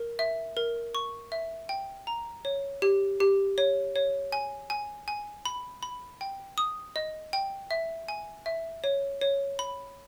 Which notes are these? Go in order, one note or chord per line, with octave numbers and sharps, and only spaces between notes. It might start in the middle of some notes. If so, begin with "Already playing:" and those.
Already playing: A#4
E5
A#4
C#6
E5
G5
A#5
C#5
G4
G4
C#5
C#5
G#5
G#5
G#5
B5
B5
G5
D#6
D#5
G5
E5
G#5
E5
C#5
C#5
B5